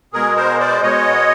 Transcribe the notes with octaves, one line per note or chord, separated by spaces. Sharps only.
B2 G#3 G#4 A#4
A#4 C5
C5 D5
B2 G#3 C#5 D#5